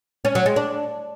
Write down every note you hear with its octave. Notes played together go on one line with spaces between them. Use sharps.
C#4
F#3
G#3
D4